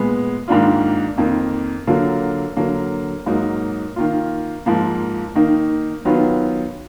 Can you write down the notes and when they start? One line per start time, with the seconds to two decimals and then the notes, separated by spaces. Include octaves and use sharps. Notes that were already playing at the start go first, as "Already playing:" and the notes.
Already playing: A#2 G#3 B3
0.48 G#2 D#3 A#3 D4 F4
1.18 F2 D#3 A#3
1.87 D3 F#3 A#3 F4
2.57 D3 F#3 A#3
3.26 G#2 F#3 A#3 D#4
3.96 D#3 A#3 F4
4.66 G#2 F3 A#3
5.35 D#3 A#3 D#4
6.05 D#3 F#3 B3 F4